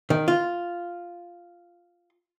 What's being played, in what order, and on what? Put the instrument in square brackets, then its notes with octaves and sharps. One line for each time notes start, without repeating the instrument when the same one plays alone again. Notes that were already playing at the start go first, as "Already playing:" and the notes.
[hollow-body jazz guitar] D#3
F4